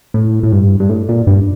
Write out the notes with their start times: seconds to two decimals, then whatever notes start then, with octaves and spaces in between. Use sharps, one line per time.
0.14 A2
0.43 A2
0.52 G2
0.80 G2
0.89 A2
1.09 A#2
1.27 G2